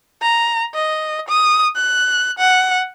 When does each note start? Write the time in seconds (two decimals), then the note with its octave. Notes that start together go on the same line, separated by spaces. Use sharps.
0.22 A#5
0.74 D#5
1.29 D#6
1.76 F#6
2.39 F#5